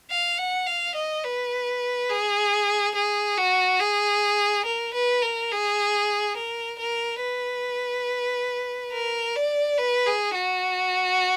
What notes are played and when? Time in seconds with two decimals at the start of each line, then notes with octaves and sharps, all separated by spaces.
0.10 F5
0.38 F#5
0.66 F5
0.95 D#5
1.24 B4
2.09 G#4
2.95 G#4
3.37 F#4
3.80 G#4
4.65 A#4
4.94 B4
5.22 A#4
5.51 G#4
6.36 A#4
6.79 A#4
7.22 B4
8.92 A#4
9.35 D5
9.78 B4
10.06 G#4
10.34 F#4